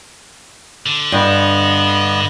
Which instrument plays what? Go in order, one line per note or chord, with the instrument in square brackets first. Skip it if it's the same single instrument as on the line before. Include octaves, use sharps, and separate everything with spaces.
[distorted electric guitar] D3
[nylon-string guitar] G2 [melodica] B3 D#5